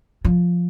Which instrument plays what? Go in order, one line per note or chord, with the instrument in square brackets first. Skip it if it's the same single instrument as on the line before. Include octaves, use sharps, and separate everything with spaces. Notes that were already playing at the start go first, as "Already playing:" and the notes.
[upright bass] F3